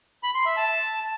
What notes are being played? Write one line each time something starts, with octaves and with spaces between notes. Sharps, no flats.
B5
C6
E5
A5